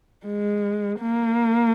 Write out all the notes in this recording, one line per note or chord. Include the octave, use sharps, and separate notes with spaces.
G#3
A#3